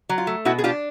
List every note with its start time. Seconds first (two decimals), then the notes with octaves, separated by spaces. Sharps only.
0.09 F#3
0.18 F4
0.27 A3
0.45 B2 E4 F#4
0.58 G#4
0.64 D4 F4 G4